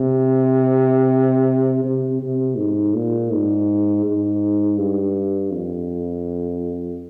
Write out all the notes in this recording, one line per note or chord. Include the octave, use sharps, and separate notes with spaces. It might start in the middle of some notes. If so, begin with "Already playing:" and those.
Already playing: C3
C3
C3
G#2
A#2
G#2
G#2
G2
F2